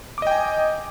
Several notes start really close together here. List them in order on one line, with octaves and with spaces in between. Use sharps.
D6 D#5 G5 G#5